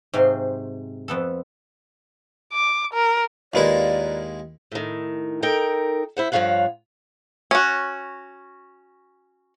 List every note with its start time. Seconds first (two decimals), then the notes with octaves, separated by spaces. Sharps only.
0.14 G#2 C3 F#3 G#4 F5 C6
1.08 F2 B3 A4
2.52 D6
2.94 A#4
3.54 D#2 G#3 E4 F4 A#4 B4 D5
4.72 A2 D#3
5.42 D#4 A4 A#4 G5
6.17 E4 C5 F#5
6.32 G2 F3 F#3 C#5 F5 F#5
7.51 C#4 F#4